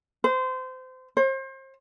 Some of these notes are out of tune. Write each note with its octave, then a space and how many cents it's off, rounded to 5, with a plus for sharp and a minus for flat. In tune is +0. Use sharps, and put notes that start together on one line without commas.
C5 -25
C5 +35